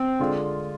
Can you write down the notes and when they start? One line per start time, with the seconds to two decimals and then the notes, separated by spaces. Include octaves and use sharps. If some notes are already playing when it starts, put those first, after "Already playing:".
Already playing: C4
0.19 D3 G#3 D4 F4